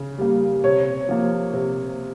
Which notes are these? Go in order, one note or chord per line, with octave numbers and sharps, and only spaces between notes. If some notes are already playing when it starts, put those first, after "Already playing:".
Already playing: C#3
G3 A#3
C3 C#5
F3 A#3
C3